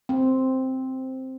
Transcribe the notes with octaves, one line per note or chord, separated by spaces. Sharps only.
C4